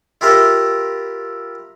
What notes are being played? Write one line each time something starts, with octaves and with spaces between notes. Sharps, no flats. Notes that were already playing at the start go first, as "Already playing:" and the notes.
E4 F4 G4 A#4 E5